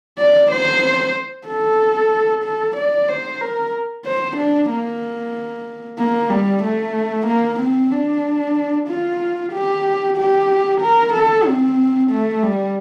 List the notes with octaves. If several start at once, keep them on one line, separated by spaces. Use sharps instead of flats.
D5
C5
A4
A4
D5
C5
A#4
C5
D4
A#3
A#3
G3
A3
A#3
C4
D4
F4
G4
G4
A#4
A4
C4
A3
G3